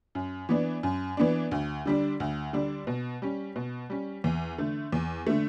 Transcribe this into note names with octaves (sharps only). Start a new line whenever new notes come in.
F#2
E3 B3 D4
F#2
E3 B3 D4
D2
D3 G3 D4
D2
D3 G3 D4
B2
G3 C#4
B2
G3 C#4
E2
D3 A3
E2
D3 A3